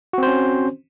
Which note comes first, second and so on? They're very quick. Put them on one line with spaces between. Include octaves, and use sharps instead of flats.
F#4 C4 C5 C#4